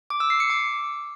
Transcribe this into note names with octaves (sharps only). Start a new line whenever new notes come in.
D6
E6
C7
C#7
D6